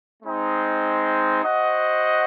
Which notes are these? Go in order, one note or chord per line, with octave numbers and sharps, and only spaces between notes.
G#3 C4 D#4
F#4 C5 D#5 F#5